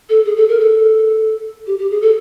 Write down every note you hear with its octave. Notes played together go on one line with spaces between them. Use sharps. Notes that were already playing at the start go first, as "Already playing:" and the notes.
A4
G#4
A4
A#4
A4
G4
G4
G#4
A4